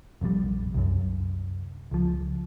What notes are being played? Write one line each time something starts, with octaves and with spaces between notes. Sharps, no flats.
F1 A#1 A#2 G3
C2 F#2
C#2 F3